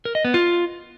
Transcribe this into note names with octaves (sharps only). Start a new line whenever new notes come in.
A#4
D#5
B3
F4